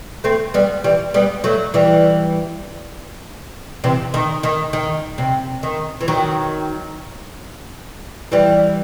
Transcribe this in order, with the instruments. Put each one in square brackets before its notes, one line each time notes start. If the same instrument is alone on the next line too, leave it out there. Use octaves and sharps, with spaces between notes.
[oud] A3 C4
G3 B3
E3 G3
G3 B3
F#3 A3
E3 G3
C3 E3
D#3
D#3
D#3
C3
D#3
E3
D#3 F#3
E3 G3